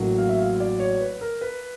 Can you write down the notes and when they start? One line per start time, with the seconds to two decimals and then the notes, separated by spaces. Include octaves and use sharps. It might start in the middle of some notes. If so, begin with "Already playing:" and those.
Already playing: A1 A2 F#3 A#3
0.18 F5
0.29 E5
0.39 F5
0.60 D5
0.80 C#5
1.01 B4
1.21 A#4
1.41 B4